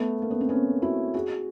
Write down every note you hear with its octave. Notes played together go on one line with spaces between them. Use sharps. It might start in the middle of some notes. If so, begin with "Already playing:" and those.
Already playing: A3 B3
A#3
B3
C4
B3 C#4
E4 F#4
F#4 G#4